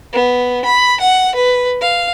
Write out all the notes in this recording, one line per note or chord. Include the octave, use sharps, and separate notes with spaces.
B3
B5
F#5
B4
F5